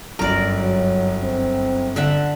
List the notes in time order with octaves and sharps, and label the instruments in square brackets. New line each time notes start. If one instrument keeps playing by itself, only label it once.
[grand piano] G1 F#2 [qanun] A#4 D5
[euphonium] F#3
C4
[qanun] D3 E5 F#5